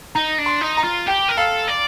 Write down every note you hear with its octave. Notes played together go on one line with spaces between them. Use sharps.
D#4 A#5
D4
C6
D#4
A#5
F4
G4 G5
A#4
A4 F5
D5